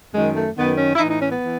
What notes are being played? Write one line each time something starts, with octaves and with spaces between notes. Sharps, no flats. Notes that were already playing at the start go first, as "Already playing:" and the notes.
F#2 D#3 G#3
A3
F#2 D#3 B3
C#4
E4
A2 E3 D#4
D#4
C#4
B3
E3